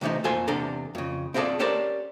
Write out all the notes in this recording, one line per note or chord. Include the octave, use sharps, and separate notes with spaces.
C3 E3 F3 A3 D#4
F2 A#2 A4 C5 G#5 C6
E2 C3 D4 A4 A#5
F2 C#3
C4 E4 F4 G#4 A4 D5
C#4 G4 A4 A#4 C5 D5